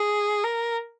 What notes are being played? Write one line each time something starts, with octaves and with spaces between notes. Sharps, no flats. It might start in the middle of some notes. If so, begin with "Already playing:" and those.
Already playing: G#4
A#4